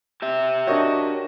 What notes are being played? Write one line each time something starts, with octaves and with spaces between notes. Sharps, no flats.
G4 E5
D4 F#4 A#4 C#5 D#5 C#6